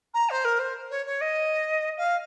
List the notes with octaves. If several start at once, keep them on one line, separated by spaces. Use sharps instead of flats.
A#5
C5
A#4
C5
C#5
C#5
D#5
F5